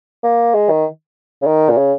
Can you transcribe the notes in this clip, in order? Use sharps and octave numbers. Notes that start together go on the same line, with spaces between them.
A#3
G#3
D#3
C#3
D#3
A#2
C#3